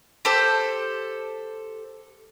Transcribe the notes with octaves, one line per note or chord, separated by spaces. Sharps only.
G4 A4 C5